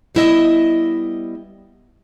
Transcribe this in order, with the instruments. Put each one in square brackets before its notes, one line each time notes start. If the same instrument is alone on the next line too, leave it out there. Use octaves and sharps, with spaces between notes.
[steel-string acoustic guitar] G3 B3 E4 A#4 D#5 E5